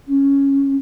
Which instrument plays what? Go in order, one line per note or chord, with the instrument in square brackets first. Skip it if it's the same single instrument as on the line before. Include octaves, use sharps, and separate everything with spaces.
[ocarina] C#4